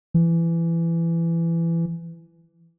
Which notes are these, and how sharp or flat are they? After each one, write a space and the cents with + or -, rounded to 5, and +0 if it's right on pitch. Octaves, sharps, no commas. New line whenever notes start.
E3 +20